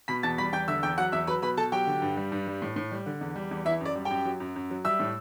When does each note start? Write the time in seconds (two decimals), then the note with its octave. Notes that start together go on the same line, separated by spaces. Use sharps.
0.08 B2 B5 B6
0.23 E2 A5 A6
0.38 G3 B5 B6
0.53 E2 G5 G6
0.68 D3 E5 E6
0.83 E2 G5 G6
0.98 F#3 F#5 F#6
1.12 E2 E5 E6
1.27 F#3 B4 B5
1.42 B2 B4 B5
1.57 B2 A4 A5
1.72 F#3 G4 G5
1.87 D3
2.02 G2
2.17 G3
2.32 G2
2.47 G3
2.62 A2
2.76 A2
2.91 G3
3.06 D3
3.21 E2
3.36 G3
3.51 E2
3.65 E3 E4 E5
3.80 F#2
3.85 D5
3.96 G3
4.05 F#2 G4 G5
4.25 F#3
4.40 F#2
4.56 F#2
4.70 F#3
4.84 G3 E5 E6
5.00 A2